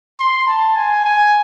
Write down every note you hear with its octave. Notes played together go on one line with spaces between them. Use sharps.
C6
A5
G#5
G#5